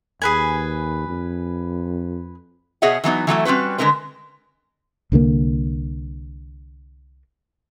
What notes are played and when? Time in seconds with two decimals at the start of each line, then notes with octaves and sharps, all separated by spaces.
0.22 D#2 G#4 B4 G#5
1.07 F2
2.82 B2 G#4 C#5 D#5 E5 F#5
3.04 E3 F#3 B3 D#4
3.27 E3 F#3 A3 E4
3.45 G3 C4 C#4 F#4 B4
3.78 D3 G#3 D#4 A#4 B4
5.12 C2 D3 G3 A#3